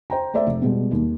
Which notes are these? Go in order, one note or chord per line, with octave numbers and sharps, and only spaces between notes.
C5 G5 A#5
A3 A4 C5 D5 E5
F1
B2 G3 G#3
D#2